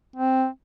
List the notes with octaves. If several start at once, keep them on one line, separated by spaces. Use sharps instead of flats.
C4